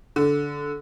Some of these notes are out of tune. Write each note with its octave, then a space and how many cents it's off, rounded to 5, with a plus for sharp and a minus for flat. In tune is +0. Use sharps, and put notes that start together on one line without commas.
D3 -15